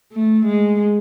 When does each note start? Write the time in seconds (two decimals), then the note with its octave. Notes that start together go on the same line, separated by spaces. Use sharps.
0.12 A3
0.45 G#3